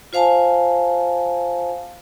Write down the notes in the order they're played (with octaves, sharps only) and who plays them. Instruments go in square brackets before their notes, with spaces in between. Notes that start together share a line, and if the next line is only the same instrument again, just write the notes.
[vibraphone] F4 C5 F5 G#5 A5